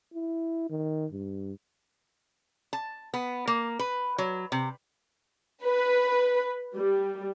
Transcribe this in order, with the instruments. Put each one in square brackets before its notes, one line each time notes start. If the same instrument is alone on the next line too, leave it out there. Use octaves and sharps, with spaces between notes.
[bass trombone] E4
D#3
G2
[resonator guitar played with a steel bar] A5
B3
A#3
B4
F#3
C3
[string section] B4
G3